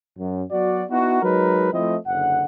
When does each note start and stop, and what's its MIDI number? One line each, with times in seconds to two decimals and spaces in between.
0.17 0.43 42
0.51 0.82 54
0.51 0.82 59
0.51 0.82 66
0.51 0.82 74
0.89 1.20 59
0.89 1.20 63
0.89 1.20 64
0.89 1.20 66
1.22 1.69 54
1.22 1.69 56
1.22 1.69 63
1.22 1.69 70
1.22 1.69 71
1.72 1.95 53
1.72 1.95 57
1.72 1.95 60
1.72 1.95 64
1.72 1.95 75
2.07 2.45 30
2.07 2.45 50
2.07 2.45 78